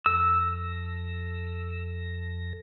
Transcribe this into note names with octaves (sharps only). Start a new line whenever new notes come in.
F2 A4 E6 A#6